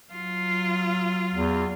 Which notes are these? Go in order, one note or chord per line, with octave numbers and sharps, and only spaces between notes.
F#3 F4
E2